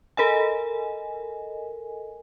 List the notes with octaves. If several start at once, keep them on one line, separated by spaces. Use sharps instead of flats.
A4 A#4 D#5 G#5